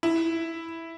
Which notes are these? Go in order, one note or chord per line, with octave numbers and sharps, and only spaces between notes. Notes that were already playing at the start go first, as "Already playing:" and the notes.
E4